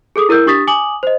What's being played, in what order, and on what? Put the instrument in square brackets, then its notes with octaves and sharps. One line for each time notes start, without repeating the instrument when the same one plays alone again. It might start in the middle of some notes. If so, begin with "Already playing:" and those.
[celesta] G#4 A4 D6 D#6
E4 A#4 E6 G6
D4 G4 C#6 D#6 A6 B6
G#5 D6 D#6 F#7
C5 D#5